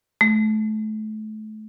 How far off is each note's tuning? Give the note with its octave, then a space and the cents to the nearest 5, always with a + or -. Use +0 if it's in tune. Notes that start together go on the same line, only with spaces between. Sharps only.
A3 -30